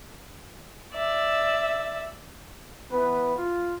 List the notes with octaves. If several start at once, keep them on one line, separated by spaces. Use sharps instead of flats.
D5 E5
E3 B3 B4
F4